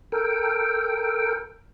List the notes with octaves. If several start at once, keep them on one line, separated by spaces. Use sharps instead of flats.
A4 A#4 G5